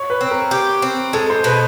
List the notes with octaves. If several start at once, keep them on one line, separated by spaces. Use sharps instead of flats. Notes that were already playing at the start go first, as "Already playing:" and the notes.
Already playing: C#5
B4
C4
A#4
G4
C4
G#3 A4
C5
B2 B4